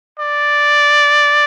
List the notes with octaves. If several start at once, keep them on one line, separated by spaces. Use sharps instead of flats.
D5